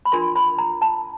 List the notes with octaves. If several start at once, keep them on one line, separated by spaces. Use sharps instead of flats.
B5
D4 F4 A#4 C6
B5
A#5
A5